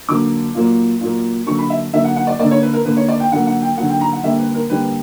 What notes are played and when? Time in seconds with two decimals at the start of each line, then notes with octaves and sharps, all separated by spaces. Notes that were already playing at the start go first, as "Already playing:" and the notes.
0.09 D3 F#3 A#3 D6
0.55 A#2 F#3 A#3
1.01 A#2 F#3 A#3
1.46 D3 F#3 A#3 C#6
1.59 B5
1.70 E5
1.93 D3 F#3 A#3 E5
2.04 F#5
2.16 F#5
2.27 D5
2.39 A#3 D5
2.43 D3
2.51 C#5
2.62 B4
2.74 A#4
2.85 D3 A#3 B4
2.97 C#5
3.08 D5
3.20 G5
3.31 D3 F#3 A#3 F#5
3.47 F#5
3.62 G5
3.77 D3 F#3 A#3 F#5
3.89 G5
4.01 A#5
4.13 F#5
4.23 D3 G3 A#3 E5
4.39 B4
4.55 A#4
4.70 D3 G3 A#3 B4